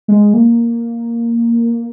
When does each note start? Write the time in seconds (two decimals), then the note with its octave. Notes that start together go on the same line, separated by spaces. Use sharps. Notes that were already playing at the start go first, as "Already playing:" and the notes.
0.08 G#3
0.34 A#3